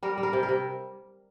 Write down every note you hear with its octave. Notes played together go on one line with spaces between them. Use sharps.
G3 A#4
G3
A#4
C3
A#4
C3